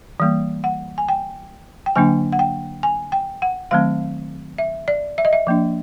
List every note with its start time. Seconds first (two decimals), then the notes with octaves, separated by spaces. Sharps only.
0.20 E3 G3 A#3
0.64 F#5
0.98 G#5
1.09 G5
1.86 G5
1.96 D3 F#3 A#3 D4 G#5
2.32 F#5
2.39 G5
2.83 G#5
3.12 G5
3.42 F#5
3.71 D#3 F#3 A3 C4 F5
4.58 E5
4.88 D5
5.18 E5
5.25 D#5
5.33 E5
5.47 F3 A#3 D4